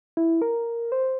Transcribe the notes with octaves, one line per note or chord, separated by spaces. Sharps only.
E4
A#4
C5